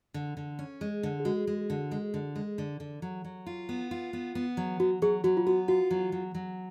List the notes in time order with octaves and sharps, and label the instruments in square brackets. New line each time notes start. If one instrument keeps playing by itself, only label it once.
[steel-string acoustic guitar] D3
D3
C#4
G#3
D3
[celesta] G#4
[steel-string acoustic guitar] G#3 [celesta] F#4
[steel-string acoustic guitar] G#3
D3
G#3
D3
G#3
D3
D3
F#3
F#3
F4
B3
F4
B3
B3
F#3
[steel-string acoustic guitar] F#3 [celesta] F#4
[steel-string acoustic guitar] F#3 [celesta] G#4
[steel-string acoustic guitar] F#3 [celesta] F#4
[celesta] F4
[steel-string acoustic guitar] B3 [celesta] F#4
[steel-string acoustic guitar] F4 [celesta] F#4
[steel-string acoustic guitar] F#3
F#3
F#3